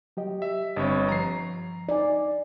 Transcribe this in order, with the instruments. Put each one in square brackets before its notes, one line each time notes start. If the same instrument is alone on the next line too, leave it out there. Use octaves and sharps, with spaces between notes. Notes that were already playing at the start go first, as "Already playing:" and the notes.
[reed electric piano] F#3 G4 D#5
[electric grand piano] E5
[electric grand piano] G1 G2 C#5 [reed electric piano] C4 D#5
[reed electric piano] G2 F3 [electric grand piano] A#5 C7
[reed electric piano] D#4 G#5 [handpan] D5